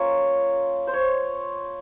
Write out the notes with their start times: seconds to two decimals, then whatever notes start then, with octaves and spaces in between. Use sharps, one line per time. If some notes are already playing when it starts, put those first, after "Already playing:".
Already playing: A#3 C#4 F4 C#5
0.87 C5
0.93 C#5